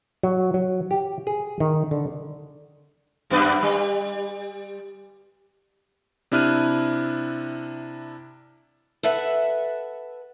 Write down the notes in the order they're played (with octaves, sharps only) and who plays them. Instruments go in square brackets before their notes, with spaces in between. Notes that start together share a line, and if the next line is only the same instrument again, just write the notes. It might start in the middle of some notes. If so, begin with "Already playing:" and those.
[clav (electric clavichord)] F#3
F#3
G4
G#4
D#3
D3
[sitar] F#2 B3 B4
G3
[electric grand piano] C3 D4 E4 F6 F#6 D#7
[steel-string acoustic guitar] A4 B4 E5 F#5